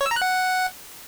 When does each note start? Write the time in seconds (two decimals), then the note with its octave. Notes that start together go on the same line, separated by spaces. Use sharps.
0.01 C#5
0.06 E6
0.11 A#5
0.16 F#6
0.22 F#5